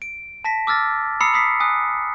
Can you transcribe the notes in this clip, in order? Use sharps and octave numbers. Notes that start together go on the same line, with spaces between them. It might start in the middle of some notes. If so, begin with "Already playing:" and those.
D7
A5 A#6 B6
D6 E6 F6 A6 A#6
A#5 B5 D#6 E6 C7 C#7
B5 D#6 B6 C7
G#5 D#6 F#6